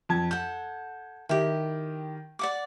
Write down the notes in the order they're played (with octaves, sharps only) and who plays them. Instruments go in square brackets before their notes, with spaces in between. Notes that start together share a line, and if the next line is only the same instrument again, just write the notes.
[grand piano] F2 A5 G#6
[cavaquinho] A4 F#5 [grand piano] G6
[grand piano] D#3 [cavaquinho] E4 G4
[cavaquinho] D5 F#5 D6